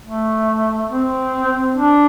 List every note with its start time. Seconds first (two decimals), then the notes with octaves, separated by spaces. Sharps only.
0.04 A3
0.90 C4
1.76 D4